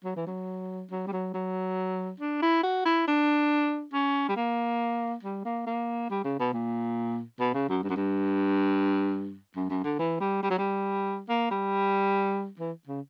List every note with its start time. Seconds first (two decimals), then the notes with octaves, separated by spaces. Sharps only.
0.04 F#3
0.16 E3
0.27 F#3
0.91 F#3
1.07 G3
1.12 F#3
1.34 F#3
2.20 D4
2.42 E4
2.63 F#4
2.85 E4
3.07 D4
3.93 C#4
4.29 G3
4.36 A#3
5.23 G3
5.45 A#3
5.66 A#3
6.10 G3
6.24 C#3
6.39 B2
6.53 A#2
7.40 B2
7.54 C#3
7.69 F#2
7.83 G2
7.89 F#2
7.96 G2
9.56 F#2
9.70 F#2
9.84 D3
9.99 E3
10.20 G3
10.43 G3
10.50 F#3
10.58 G3
11.28 A#3
11.51 G3
12.59 E3
12.87 C#3